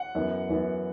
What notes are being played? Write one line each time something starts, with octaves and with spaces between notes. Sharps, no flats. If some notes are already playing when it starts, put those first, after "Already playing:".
Already playing: F#5
F#2 E3 B3
F#2 E3 B3